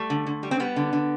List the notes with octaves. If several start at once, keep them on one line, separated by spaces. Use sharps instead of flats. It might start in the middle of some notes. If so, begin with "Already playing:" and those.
Already playing: G3 A3
D3
D3
G3
C4
G3 B3
D3
D3